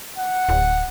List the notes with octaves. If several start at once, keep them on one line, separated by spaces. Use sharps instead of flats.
F#5
D1